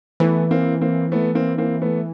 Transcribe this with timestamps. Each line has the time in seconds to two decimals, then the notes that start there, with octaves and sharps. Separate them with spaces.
0.20 E3 A3 B3
0.51 A#3 C4
0.81 A#3 C4
1.12 A3 B3
1.35 A#3 C4
1.58 A#3 C4
1.82 A3 B3